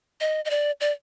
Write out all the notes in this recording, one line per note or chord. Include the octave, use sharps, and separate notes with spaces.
D#5
D#5
D5
D5